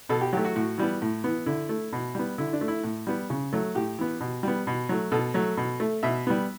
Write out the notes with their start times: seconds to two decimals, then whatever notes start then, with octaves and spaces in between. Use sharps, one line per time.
0.09 B2 A4
0.21 G4
0.33 F#3 A3 G4
0.45 F#4
0.56 A2 F#4
0.78 E3 G3 B3
1.02 A2
1.24 E3 B3
1.46 D3 E4
1.69 A3
1.93 B2
2.15 G3 B3
2.38 D3 E4
2.53 D4
2.61 A3
2.68 E4
2.84 A2
3.07 G3 B3
3.30 C#3
3.53 F#3 A3
3.75 A2 G4
3.98 E3 B3
4.20 B2
4.43 G3 B3
4.67 B2
4.89 F#3 A3
5.11 B2 A4
5.34 F#3 A3
5.57 B2
5.80 A3
6.03 B2 E5
6.27 G3 B3